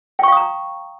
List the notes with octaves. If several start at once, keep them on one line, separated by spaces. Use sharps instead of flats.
F5 G5 A#5 C#6 D#6